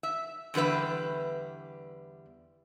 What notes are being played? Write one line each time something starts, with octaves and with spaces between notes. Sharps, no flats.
E5
E2 D3 G3 B4 E5